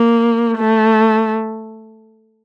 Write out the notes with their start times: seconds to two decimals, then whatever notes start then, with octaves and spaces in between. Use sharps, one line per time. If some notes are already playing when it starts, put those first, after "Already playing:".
Already playing: A#3
0.59 A3